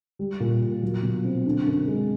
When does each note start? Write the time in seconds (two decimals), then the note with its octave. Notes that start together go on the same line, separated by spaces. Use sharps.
0.19 G3
0.40 A#2
0.61 A#2
0.83 F#3
1.03 B2
1.25 C4
1.46 D3
1.66 F#2
1.87 G#3